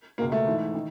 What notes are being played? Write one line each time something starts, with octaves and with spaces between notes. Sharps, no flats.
C#2 B2 A#3
A3
G#2 E3
D#3